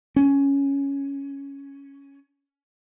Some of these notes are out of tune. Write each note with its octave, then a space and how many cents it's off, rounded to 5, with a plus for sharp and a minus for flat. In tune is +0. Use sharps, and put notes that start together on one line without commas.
C#4 +5